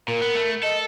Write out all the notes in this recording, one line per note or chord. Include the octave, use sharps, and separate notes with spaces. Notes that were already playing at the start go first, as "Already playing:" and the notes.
A#2 A#4
B3
A3
A4 D#5